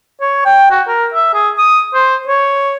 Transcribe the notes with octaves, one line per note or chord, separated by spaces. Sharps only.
C#5
G5
F#4
A#4
E5
G#4
D#6
C5
C#5